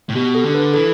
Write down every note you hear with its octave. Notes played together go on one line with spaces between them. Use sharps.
A2
B2 G4
A4
D3
B4
E3 A4